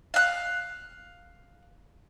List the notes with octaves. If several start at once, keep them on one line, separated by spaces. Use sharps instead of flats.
F5 F#6